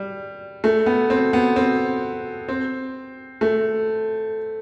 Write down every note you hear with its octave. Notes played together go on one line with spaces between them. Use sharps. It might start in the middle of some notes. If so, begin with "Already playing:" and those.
Already playing: G3
A3
B3
C4
B3
C4
C4
A3